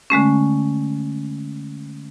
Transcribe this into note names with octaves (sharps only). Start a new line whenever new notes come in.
D3 G#3 A3 C#4